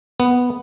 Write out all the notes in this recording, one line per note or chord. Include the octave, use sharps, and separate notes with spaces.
B3